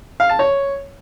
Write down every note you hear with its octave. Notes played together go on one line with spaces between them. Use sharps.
F5
A5
C#5